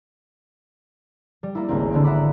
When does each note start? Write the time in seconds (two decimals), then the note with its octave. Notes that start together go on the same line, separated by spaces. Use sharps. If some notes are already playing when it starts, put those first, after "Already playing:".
1.43 G3
1.55 A#3 E4
1.69 G#1 C#2 A#3 C4
1.92 D3 B3 C4
2.04 E5 F#5 A#5 B5 D6